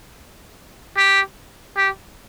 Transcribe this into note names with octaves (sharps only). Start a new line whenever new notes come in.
G4
G4